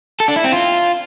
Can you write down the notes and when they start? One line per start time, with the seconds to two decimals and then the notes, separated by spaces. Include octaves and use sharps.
0.20 A4
0.28 D4
0.36 E4
0.44 C4
0.52 F4